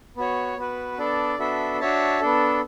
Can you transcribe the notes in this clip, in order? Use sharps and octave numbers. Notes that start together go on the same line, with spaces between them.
B3 F#4 C#5
B3 F#4 B4
B3 D4 A4 D5
B3 D4 F#4 A4 E5
D4 F#4 C#5 E5 A5
B3 D4 A4